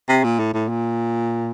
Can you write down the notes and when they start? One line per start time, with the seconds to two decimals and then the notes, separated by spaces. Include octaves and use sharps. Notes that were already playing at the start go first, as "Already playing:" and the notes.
0.09 C3
0.24 A#2
0.39 A2
0.54 A2
0.69 A#2